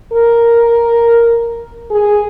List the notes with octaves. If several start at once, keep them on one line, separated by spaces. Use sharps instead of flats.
A#4
G#4